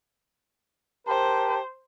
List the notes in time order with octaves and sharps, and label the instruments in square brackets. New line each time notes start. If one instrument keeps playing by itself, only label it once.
[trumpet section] G4 A#4 A5 [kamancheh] C5